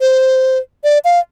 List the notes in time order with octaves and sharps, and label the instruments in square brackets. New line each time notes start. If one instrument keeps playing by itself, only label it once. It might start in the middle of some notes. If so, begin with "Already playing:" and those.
[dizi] C5
D5
F5